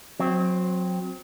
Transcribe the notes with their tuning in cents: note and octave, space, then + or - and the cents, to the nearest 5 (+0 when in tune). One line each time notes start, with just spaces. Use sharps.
F#3 -25 C4 +0